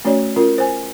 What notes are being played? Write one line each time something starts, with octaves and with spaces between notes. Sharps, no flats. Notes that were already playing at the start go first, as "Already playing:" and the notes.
A3 C#4 F#4 C#5 D5
C#4 F4 A#4
C5 G#5